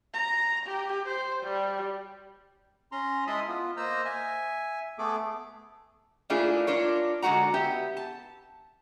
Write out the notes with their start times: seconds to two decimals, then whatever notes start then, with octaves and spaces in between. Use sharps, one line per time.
0.14 A#5
0.67 G4
1.06 C5
1.43 G3
2.92 C#4 A#5 C6
3.27 G#3 E4 A5 B5 C6 D#6
3.48 B3 F4
3.77 A#3 C5 D#5 A#5 E6
4.05 E5 G#5
4.98 A3 B3 G#4 A4 D6
6.30 A3 A#3 D4 E4 F4 G#4
6.67 D4 F4 A#4 C#5
7.22 D3 G#3 B3 F#4 F#5 A#5
7.54 B3 G4 E5
7.97 A5